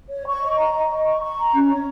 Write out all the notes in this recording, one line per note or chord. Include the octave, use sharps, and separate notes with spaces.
C#5
C#6
D#5
A#5
D#5
D#5
C#6
C#6
A#5
C#4
C#5